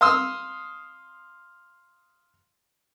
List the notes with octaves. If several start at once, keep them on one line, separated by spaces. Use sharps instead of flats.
F5 C6 D#6 E6